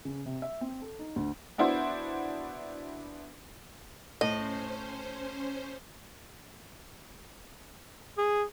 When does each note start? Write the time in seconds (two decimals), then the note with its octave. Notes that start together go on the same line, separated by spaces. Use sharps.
0.05 C#3
0.26 C3
0.42 E5
0.61 C4
0.82 A4
0.99 D#4
1.16 D2
1.58 B3 D4 E4 F#4 C5
4.21 A2 C#4 C5 D#5
8.18 G#4